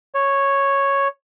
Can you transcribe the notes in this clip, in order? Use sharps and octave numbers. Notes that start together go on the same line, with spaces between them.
C#5